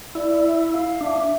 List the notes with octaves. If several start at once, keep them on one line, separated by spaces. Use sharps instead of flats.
E4 D5
E5
F5
D4 E5